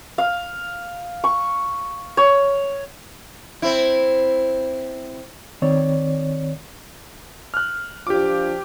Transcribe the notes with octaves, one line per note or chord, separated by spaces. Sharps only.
F5
C#6
C#5
C4 E4
D#3 C4 C#5 D5
F6 F#6
F3 D4 F4 G4 D6